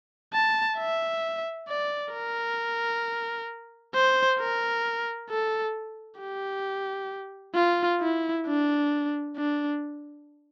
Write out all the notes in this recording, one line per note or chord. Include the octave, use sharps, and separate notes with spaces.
A5
E5
D5
A#4
C5
A#4
A4
G4
F4
E4
D4
D4